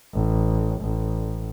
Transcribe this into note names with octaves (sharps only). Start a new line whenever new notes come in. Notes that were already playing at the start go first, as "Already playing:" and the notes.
A1
A1